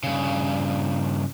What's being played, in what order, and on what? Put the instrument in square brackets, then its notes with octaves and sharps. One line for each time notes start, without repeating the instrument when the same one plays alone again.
[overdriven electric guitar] G2 C#3